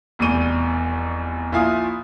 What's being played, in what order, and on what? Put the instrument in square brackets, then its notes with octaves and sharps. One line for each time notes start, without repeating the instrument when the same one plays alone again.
[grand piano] F1 E2 B2 G3 D#7 G7
A#1 E4 F4 F5 G#5 D#6